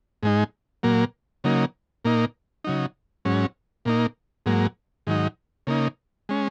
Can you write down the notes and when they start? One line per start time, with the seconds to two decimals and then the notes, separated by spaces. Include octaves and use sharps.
0.23 G#2 G#3 D#4
0.83 A#2 F#3 A#3
1.44 C#3 F#3 A#3 D#4
2.05 A#2 A#3 D#4
2.64 C#3 F#3 D#4
3.25 G#2 F#3 C#4
3.85 A#2 A#3 D#4
4.46 G#2 F#3 A#3
5.07 G#2 D#3 F#3 D#4
5.67 C#3 A#3 D#4
6.29 G#3 C#4